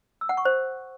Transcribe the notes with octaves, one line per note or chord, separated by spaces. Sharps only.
E6
F#5
C#6
C5